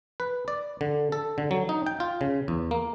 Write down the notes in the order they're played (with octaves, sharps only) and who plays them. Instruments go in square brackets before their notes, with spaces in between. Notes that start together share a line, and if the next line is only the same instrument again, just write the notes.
[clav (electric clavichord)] B4
D5
D3
A4
D3
F#3
D#4
G5
F4
C#3
E2
A#3